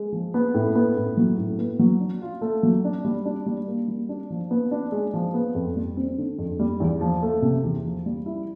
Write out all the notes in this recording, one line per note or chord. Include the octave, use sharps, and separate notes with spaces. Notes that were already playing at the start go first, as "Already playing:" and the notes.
Already playing: G#3
F3
B3
A2
B3
A2
F#3
A2
B3
F#3
D4
F4
A3
F#3
D4
G3
D4
G3
A#3
G3
D4
F3
B3
D4
G#3
F3
B3
F2
G3
C4
D3
F2
G3
E2
F3
A3
C3
E2
F3
G3
E4